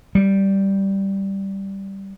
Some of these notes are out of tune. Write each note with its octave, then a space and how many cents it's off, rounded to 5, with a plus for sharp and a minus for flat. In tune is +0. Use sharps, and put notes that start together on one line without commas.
G3 -5